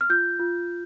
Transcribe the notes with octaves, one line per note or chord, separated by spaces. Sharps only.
F6
F4 G6
F4